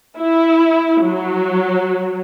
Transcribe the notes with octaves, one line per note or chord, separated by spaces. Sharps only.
E4
F#3